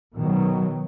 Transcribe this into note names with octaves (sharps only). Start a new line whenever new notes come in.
B2 D#3 F#3